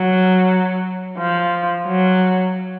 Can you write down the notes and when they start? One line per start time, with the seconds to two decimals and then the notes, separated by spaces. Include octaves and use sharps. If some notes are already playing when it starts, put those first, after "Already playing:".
Already playing: F#3
1.18 F3
1.87 F#3